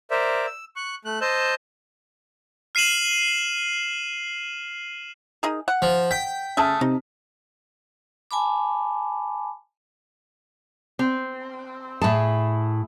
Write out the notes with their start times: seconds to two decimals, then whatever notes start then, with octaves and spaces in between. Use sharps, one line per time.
0.11 A#4 C5 D5 E5
0.46 E6
0.76 C#6 F#6
1.05 A3 F#6
1.21 C5 D#5 A5 E6 G6
2.75 F6 C7 D#7 E7 F#7
5.43 D#4 G#4 A#4
5.68 F#5
5.82 F3
6.11 G5 B6
6.57 C#3 A3 G#4 A5 D#6 F6
6.81 C3 D#4
8.31 G#5 A5 B5 D6
10.99 C4
12.02 A2 E4 G#4 A5